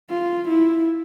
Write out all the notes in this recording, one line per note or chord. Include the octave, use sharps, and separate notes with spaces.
F4
E4